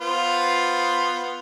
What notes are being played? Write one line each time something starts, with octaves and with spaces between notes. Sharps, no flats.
B3 F4 C5